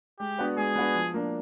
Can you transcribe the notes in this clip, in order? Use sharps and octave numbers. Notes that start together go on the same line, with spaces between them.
G#3 G4
B3 D4 F#4 B4
G#3 G#4
B3 D4 F#4 B4
F3
A#3 D4